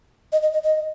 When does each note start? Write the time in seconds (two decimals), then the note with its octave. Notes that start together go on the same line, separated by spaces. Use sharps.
0.32 D#5
0.43 D#5
0.53 D#5
0.63 D#5